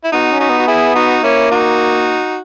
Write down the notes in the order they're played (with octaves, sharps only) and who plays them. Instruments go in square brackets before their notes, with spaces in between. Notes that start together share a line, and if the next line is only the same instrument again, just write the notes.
[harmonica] E4
[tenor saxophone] B3 [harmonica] D#4 F#4
[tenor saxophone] C#4
[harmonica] D#4 F#4
[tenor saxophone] B3
[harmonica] F#4
E4 G#4
D#4 F#4
[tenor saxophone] A#3 [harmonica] C#4 E4
[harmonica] D#4 F#4